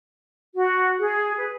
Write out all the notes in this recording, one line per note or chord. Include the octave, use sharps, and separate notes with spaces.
F#4
G#4
B4